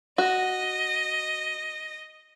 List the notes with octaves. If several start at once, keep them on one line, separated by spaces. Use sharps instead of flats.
F#4 D#5